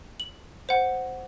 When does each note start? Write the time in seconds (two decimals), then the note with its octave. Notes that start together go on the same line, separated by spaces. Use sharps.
0.20 F#7
0.69 C5 F#5